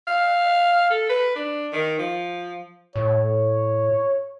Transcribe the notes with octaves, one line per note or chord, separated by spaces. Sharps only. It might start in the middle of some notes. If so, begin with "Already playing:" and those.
F5
A4
B4
D4
D#3
F3
A2 C#5